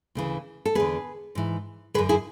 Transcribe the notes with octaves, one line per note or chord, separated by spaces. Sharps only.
D2 C#3 E3
A4
E2 D3 G#4 B4
G#2 E3
F#2 D3 G#4 B4
E4 G#4